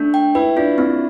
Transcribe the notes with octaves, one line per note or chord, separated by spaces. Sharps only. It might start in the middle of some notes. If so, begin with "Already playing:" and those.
Already playing: A3 D4
G5
E4 B4
D4 F4
C4 E4